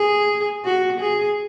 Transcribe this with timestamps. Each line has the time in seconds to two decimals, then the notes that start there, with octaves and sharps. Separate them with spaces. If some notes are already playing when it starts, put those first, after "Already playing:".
Already playing: G#4
0.65 F#4
1.00 G#4